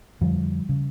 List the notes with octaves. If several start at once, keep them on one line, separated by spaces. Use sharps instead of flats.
F2 D3 F3 G3
C#3